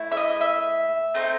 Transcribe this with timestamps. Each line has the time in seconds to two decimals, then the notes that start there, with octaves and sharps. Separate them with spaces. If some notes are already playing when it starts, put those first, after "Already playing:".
Already playing: A3 E4
0.12 E5
0.17 D#5
0.41 E5
1.14 A3 C4 D#4